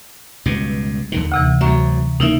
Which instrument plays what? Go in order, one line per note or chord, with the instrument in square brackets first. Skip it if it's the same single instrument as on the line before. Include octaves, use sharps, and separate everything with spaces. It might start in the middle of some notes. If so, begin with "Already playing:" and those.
[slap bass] C#2 G2 B2
D#2 D3 D#3
[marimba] D2 C3 E3
[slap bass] D2 F#3 [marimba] E5 A#5 C#6
[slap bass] C#3 A#3 [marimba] D#4 E4 E5